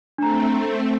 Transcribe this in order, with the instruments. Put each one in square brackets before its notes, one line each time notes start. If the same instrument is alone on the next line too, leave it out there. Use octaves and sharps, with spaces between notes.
[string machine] A3 C4 [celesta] D4 A#5